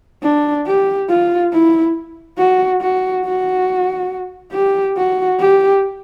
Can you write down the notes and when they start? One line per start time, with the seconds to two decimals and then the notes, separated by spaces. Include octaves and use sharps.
0.23 D4
0.67 G4
1.09 F4
1.53 E4
2.38 F#4
2.81 F#4
3.25 F#4
4.53 G4
4.97 F#4
5.40 G4